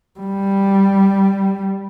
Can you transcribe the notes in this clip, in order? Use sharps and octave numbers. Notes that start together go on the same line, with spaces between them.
G3